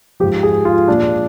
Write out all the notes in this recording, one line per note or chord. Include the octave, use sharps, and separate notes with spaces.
G#2 F3 G4
G#4
F4
A#2 F3 D4